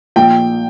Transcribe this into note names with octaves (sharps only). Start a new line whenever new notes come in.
A#1 G5